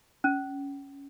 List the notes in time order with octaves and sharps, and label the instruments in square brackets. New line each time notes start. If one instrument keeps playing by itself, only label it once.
[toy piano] C#4